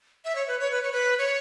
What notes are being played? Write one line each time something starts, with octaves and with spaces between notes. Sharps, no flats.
E5
C#5
B4
C#5
B4
C#5
B4
C#5